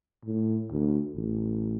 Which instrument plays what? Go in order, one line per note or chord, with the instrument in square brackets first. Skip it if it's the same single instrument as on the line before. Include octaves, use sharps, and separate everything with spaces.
[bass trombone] A2
D2
A1